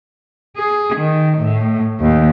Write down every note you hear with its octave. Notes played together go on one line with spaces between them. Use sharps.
G#4
D#3
A2
D#2